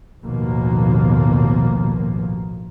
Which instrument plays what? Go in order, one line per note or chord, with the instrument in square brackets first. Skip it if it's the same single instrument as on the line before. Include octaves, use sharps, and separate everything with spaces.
[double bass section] A1 D#2 B2 F3 A#3